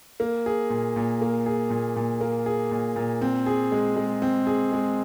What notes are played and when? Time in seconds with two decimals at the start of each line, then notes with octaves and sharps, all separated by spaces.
0.20 A#3
0.46 G#4
0.70 A#2
0.96 A#2
1.21 A#3
1.46 G#4
1.70 A#2
1.96 A#2
2.21 A#3
2.46 G#4
2.71 A#2
2.96 A#2
3.21 C4
3.46 G#4
3.72 G#3
3.96 G#3
4.22 C4
4.47 G#4
4.72 G#3